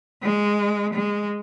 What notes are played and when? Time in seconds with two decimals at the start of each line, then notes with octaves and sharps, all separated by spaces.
0.22 G#3
0.93 G#3